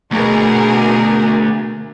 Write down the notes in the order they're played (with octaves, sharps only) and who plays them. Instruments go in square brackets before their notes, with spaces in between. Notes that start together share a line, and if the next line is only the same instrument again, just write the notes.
[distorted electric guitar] D2 [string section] B2 G#4 A#4